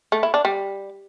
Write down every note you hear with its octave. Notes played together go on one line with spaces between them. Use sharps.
A3
E4
D4
G3